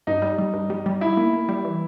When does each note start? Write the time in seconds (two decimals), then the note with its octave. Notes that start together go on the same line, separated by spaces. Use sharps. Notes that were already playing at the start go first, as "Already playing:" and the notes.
0.07 G2 D#4
0.22 G3
0.39 G3
0.54 G2
0.70 G3
0.86 G3
1.01 D#4 E4
1.17 A#3
1.33 A#3
1.49 G3
1.65 E3